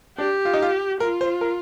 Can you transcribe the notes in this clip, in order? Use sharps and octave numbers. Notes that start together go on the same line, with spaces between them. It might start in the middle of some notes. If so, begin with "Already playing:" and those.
D4 G4
F4
D#4
F4
F4 A#4
C5
A#4